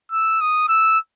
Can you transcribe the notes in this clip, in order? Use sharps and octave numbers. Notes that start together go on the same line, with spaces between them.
E6
D#6
E6